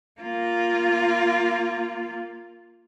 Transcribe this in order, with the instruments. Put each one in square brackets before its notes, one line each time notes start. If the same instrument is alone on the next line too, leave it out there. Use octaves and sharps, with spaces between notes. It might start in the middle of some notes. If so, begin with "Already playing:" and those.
[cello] A#3 F4